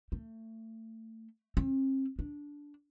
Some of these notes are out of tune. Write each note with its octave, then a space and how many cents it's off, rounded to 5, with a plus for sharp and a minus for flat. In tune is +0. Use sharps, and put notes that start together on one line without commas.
A3 +25
C4 +40
D4 -10